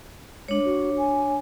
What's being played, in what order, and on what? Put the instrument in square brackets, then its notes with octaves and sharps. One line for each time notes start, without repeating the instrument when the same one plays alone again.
[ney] G#3 [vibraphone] D4 C#5
[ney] F#4
G#5